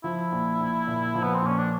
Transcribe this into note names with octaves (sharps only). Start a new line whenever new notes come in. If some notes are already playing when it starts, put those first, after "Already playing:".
F3 E4
A#1
A#1
A#2
F3
B3
C4
A#1 C#4
D4